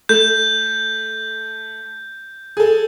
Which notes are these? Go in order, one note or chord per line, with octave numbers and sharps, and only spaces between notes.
A3 G6
G#4 A4